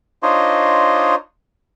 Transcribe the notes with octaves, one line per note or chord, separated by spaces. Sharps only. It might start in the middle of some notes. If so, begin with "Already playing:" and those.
D4 D#4 F4 C5 C#5 D#5